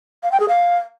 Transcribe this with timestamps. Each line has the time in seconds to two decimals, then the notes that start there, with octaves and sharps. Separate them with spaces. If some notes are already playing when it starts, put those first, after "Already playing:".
0.23 F5
0.32 G5
0.40 G#4
0.48 F5